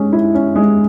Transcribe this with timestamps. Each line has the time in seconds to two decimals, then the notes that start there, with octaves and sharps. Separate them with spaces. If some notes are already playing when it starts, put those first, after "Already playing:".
Already playing: G#3 C#4
0.13 E4
0.34 C#4
0.56 G#3